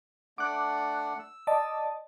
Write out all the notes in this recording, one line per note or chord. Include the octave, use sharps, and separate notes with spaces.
A3 D4 F#5 D6 F#6
E6
D5 D#5 A5